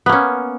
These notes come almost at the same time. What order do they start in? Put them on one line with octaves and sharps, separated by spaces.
B3 A#3 C#4